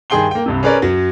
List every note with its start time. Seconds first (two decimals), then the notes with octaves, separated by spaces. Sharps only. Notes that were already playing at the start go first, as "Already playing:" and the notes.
0.10 G2 D#3 G#4 G5 C6 G7
0.31 A#3 G5
0.46 C2 G2 C3
0.63 C#4 G#4 A#4 B4 C#5 D5
0.82 F#2 F#3